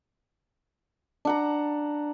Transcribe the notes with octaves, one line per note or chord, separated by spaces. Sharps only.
D4 F#5 A#5